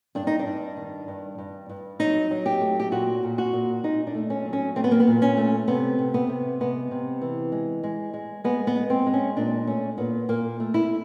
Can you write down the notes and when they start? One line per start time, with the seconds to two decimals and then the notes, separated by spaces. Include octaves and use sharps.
0.15 G2 D4
0.27 D#4
0.39 D4
0.46 G2
0.77 D#3
1.08 G2
1.38 G2
1.69 G2
2.00 F#3 D#4
2.31 F#3
2.46 G4
2.61 A3
2.80 G4
2.92 A#2 F#4
3.23 A#2
3.38 F#4
3.53 A#2
3.83 A#2 D#4
4.07 D4
4.14 A3
4.30 C#4
4.45 F#3
4.53 C#4
4.76 A3 C4
4.84 B3
4.91 A#3
5.00 B3
5.07 A#2
5.22 C#4
5.37 A3
5.68 C3 B3
5.99 C3
6.14 B3
6.29 C3
6.60 G#3 B3
6.91 C3
7.22 E3
7.52 G#3
7.83 G#3
8.14 G#3
8.44 G#3 B3
8.67 B3
8.75 G#3
8.90 C4
9.06 G#3
9.14 C#4
9.37 A#2 D4
9.67 A3 C#4
9.98 A#2 B3
10.29 A#2 A#3
10.60 A3
10.74 E4